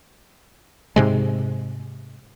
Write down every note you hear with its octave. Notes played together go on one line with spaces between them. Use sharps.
G#2 C3 G#3